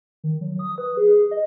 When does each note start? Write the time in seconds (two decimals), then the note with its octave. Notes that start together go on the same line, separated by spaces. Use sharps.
0.24 D#3
0.41 F#3
0.59 D#6
0.78 B4
0.97 G#4
1.31 D#5